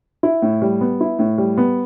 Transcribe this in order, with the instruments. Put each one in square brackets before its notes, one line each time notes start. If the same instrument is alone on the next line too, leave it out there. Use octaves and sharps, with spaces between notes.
[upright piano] E4
A2
G3
B3
E4
A2
G3
B3